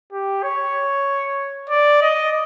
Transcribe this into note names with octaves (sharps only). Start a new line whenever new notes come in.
G4
C#5
D5
D#5